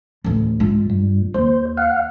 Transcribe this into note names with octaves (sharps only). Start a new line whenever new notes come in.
A1 D2
G#2 F4
G2
D#2 C5
F5 F#5